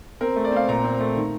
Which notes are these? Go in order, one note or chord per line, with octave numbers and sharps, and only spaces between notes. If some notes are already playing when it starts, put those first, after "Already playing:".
C4 A#4
A3
D5
C4 F5
A#2 A#5
C4
A3
D#3